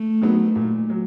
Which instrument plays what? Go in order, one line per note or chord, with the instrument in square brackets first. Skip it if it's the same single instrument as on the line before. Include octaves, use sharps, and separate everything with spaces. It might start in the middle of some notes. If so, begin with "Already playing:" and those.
Already playing: [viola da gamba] A3
[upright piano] D#3 F#3 B3
A#2
F#3